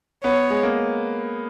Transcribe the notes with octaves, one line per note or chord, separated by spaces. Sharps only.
B3 C#5
G#3
A#3